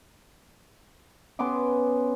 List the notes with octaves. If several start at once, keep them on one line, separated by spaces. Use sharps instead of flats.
B3 C#4 C6 D6